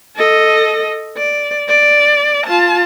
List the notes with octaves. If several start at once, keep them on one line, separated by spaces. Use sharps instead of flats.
A4 D#5
D5
D5
F4 A5